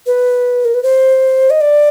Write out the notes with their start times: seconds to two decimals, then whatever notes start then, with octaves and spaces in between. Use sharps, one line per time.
0.06 B4
0.65 A#4
0.74 B4
0.83 C5
1.50 D#5
1.61 D5